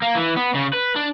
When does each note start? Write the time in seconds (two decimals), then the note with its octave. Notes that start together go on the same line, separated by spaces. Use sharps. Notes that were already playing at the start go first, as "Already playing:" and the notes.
0.02 A#3
0.15 E3
0.37 B3
0.55 C#3
0.73 B4
0.96 D4